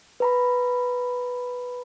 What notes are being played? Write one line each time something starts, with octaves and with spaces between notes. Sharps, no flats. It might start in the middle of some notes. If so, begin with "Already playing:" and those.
B4 A#5 B5